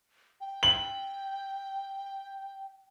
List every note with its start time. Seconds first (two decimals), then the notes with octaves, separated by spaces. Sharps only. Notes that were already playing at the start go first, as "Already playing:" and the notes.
0.41 G5
0.63 F#7